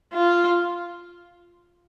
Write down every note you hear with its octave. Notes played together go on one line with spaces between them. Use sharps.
F4